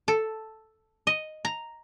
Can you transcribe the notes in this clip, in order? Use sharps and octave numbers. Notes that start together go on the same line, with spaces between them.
A4
D#5
A#5